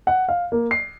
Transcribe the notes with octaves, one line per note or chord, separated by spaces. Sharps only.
F#5
F5
A#3
C7